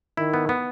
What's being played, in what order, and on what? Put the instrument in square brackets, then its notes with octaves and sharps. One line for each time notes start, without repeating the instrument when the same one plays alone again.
[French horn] D#3 [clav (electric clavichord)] E4
[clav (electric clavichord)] B3
B3